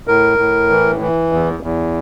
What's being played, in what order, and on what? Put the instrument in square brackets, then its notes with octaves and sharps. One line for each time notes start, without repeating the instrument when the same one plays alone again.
[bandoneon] A2 A#4
A2
E3
E3
E2
E2